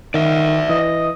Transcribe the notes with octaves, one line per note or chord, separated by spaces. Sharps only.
D#3 D5 E5
E3 D#5